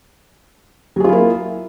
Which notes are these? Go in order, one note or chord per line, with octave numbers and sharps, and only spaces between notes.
F#3 A#3 E4 F4 G#4